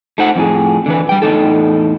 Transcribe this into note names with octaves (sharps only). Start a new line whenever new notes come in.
A3 D#4 C5 F#5
F2 A2 G#4
D3 E3 B4
G3 G5
E2 A2 E3 D#4 A4